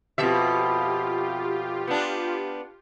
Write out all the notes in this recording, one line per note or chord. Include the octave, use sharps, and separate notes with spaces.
F2 B2 F4 G4 E5
B3 D4